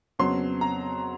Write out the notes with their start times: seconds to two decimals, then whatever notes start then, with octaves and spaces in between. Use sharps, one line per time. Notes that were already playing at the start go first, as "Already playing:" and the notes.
0.19 F2 C#3 F#3 B3 C6
0.61 A#5